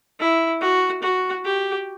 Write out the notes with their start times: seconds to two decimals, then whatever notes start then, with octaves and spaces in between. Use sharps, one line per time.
0.20 E4
0.61 F#4
1.03 F#4
1.45 G4